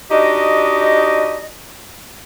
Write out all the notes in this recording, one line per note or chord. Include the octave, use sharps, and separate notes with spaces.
D4 D#4 F#4 G4 D#5